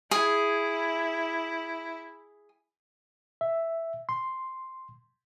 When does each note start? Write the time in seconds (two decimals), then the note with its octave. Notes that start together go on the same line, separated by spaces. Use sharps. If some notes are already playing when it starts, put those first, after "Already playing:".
0.11 E4 G#4
3.41 E5
4.09 C6